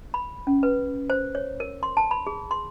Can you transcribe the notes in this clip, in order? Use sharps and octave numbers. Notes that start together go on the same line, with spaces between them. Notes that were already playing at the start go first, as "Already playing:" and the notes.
B5
C#4
B4
C5
C#5
A#4
C6
A5
B5
G#4
C6